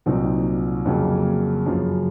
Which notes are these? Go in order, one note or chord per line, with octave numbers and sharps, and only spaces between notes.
C2 A#2 F#3 C4 D#4
F2 C#3 F#3 A#3
F#2 C#3 F3